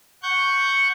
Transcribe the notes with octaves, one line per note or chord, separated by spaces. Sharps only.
F#5 C#6 G6